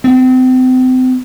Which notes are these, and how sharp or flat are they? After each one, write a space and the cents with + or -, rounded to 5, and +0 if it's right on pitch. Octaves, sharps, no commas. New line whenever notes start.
C4 -35